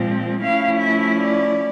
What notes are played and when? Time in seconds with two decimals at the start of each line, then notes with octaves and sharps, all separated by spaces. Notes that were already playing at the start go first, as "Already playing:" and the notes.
Already playing: A#2 F3 G#3 C4
0.41 F3 A3 C#4 E4 F5
0.79 E5
1.18 D5